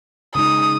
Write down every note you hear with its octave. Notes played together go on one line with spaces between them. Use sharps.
C#3 G#3 D#4 D#6